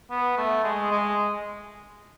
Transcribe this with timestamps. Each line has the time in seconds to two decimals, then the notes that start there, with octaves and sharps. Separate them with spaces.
0.11 B3
0.38 A3
0.64 G#3
0.92 G#3